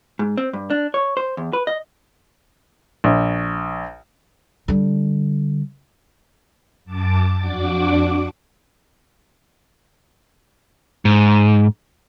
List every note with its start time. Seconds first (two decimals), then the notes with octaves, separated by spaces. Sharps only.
0.19 G#2
0.38 C4
0.53 G2
0.70 D4
0.94 C#5
1.17 C5
1.37 E2
1.53 B4
1.67 D#5
3.04 A#1
4.68 D3 G3
6.85 F#2 A5 D6
7.37 F2 D4 F#4 D6
11.05 G#2